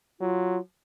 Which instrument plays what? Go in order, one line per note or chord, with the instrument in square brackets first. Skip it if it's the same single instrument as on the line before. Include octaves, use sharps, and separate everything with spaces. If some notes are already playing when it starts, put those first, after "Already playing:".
[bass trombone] F#3 [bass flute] F4